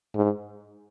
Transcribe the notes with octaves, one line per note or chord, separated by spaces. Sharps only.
G#2